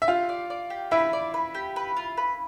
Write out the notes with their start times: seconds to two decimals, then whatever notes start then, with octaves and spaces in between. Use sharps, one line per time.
0.02 E5
0.08 F4 G4 F5
0.29 D5
0.50 D5
0.70 G4
0.91 E4 B4 E5
1.13 D5
1.34 B4
1.55 G4
1.76 B4
1.97 F4
2.17 B4